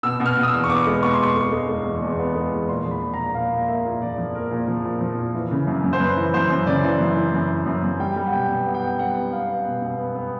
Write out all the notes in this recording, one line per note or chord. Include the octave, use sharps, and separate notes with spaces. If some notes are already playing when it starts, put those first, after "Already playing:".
B2 E6
B2
F6
B2
D#6
E6
E2
C#6
B3 D6
G#3
B2 C#6
C6
B2 C#6
G#3
G#3
G#3
E2
E2
B3
G#3
E2
A#2 C6
F3
B5
A#2
A#2 A#5
A#2 F5
A#2
A#3 E5
A#2
F3 D5
F3
A#3 A#4
A#2
F3
A#2
F3
A#2
E3
C#3
F#2
F#2
C5
F#2 B4
E3
F#2 C5
F#2
C#3 D5
E3
F#2
E3
F#2
E3
F#2
F#2
G3 G5
G3
F#5
B2 G5
B2
B3 F#5
G5
B3 F#5
G3 F#5
B3
B3 F5
B3
B2
B2
B3
B3